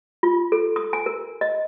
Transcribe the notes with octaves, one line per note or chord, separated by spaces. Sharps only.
F4
A4
D#6
G#5
A#4
D#5